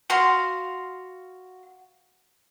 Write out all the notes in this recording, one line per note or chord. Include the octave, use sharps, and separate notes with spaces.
F#4 F5 C6